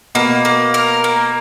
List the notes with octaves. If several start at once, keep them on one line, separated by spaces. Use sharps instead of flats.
B2 A#3
A#3
A#4
A#3